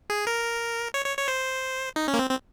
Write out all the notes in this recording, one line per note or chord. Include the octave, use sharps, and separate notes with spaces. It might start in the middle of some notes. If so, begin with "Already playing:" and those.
G#4
A#4
C#5
C#5
C#5
C5
D#4
C#4
A#3
C4
C4